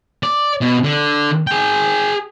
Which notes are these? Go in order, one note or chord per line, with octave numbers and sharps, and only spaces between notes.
D5
B2
D3
G#4 G5